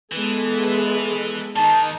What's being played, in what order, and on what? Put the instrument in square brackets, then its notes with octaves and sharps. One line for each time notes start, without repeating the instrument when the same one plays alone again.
[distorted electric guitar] E3 [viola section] G#3 B3 A4
[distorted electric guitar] B4 E5
[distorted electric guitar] D#3 A#3 [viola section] D#4 [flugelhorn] A5